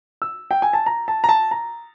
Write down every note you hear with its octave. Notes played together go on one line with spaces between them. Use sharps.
E6
G5
G#5
A5
A#5
A5
A#5
A5
A#5